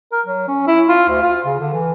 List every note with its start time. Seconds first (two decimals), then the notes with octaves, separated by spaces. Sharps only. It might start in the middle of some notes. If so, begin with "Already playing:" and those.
0.12 A#4
0.26 F#3
0.48 C#4
0.67 E4
0.89 F4
1.09 D2
1.22 F4
1.45 C#3
1.60 D3
1.73 E3